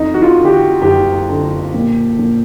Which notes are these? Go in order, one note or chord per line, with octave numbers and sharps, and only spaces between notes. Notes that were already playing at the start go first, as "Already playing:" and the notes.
Already playing: F2 D#4
F#4
F4
D3
G4
F#4
F#1 G4
D3
A#2
A#2